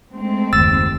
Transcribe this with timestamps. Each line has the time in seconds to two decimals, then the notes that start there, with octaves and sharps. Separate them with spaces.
0.11 G#3 A3 C4
0.53 F#1 D#2 E6 A6